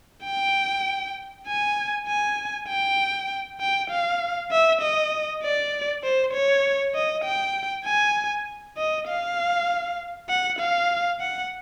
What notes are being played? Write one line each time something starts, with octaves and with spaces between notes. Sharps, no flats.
G5
G#5
G#5
G5
G5
F5
E5
D#5
D5
C5
C#5
D#5
G5
G#5
D#5
F5
F#5
F5
F#5